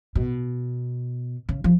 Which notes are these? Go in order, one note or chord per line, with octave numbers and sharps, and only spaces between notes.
B2
C#3
F3